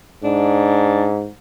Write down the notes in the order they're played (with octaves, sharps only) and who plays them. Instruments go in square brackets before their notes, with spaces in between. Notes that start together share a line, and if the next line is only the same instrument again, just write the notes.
[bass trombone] G#2 [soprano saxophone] D4